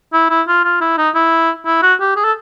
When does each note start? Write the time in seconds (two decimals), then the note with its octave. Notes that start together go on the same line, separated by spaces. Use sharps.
0.13 E4
0.30 E4
0.48 F4
0.64 F4
0.81 E4
0.97 D#4
1.15 E4
1.66 E4
1.82 F#4
2.00 G4
2.16 G#4
2.24 A4